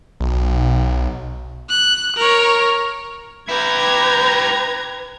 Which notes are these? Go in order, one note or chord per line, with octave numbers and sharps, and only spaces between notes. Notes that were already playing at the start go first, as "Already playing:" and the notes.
B1
F#6
A#4 C#5
E4 G4 B4 A#5 G#6